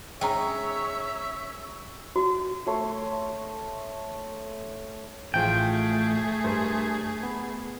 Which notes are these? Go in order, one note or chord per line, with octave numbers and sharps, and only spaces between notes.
G#3 C#4 D#4 C#5 E5 G5 A#5
F#4
A3 C#5 C6
A1 F3 A3 F4 G#4 G5
G2 A#4 C5
B3